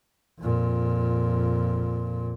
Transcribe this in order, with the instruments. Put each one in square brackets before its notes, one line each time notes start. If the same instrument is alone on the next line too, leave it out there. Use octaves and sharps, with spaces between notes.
[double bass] F2 A#2